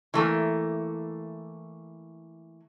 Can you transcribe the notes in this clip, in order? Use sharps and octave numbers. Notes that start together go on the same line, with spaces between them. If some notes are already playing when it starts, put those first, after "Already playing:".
E3 A3 A#3